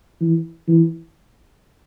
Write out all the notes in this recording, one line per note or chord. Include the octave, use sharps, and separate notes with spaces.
E3
E3